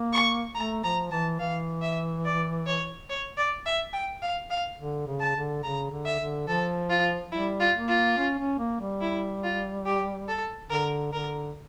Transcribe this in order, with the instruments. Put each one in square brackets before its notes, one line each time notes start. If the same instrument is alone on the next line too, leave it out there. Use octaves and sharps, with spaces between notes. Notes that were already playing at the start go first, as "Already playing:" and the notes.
Already playing: [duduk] A#3
[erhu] C#6
[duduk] A3 [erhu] A#5
[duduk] F3 [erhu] A#5
[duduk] E3 [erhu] A5
[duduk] E3 [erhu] F5
[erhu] E5
D5
C#5
C#5
D5
E5
G5
F5
F5
[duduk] D3
C#3
[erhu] A5
[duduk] D3
[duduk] C#3 [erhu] A#5
[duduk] D3
[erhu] E5
[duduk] D3
[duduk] F3 [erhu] A4
[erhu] F4
[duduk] G3 [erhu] E4
[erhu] F4
[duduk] A#3
[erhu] F4
[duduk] C#4
C#4
A#3
G3
[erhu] E4
F4
G4
A4
[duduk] D3 [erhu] A#4
[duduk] D3 [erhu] A#4